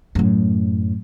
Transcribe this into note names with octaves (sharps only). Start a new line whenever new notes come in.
F#2 A2